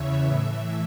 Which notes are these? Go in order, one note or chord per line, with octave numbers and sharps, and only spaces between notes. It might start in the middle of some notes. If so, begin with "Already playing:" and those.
Already playing: E2 C#3 E3 C#5 E5
A2 E3